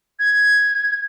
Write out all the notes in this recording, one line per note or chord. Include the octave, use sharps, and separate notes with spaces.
G#6